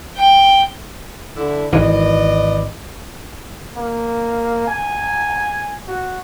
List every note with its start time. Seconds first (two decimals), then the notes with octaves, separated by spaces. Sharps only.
0.16 G5
1.36 D3 E4
1.72 G#1 E3 B4 D5 D#5
3.76 A#3
4.67 G#5
5.88 F#4